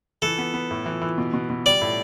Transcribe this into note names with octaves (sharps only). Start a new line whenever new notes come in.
E3 A4
B3
B3
A2
E3
E3
B2
B2
B2
G3 D5
A2